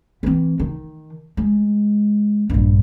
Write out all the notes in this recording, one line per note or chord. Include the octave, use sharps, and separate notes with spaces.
E3 C4
D#3
G#3
A#1 G2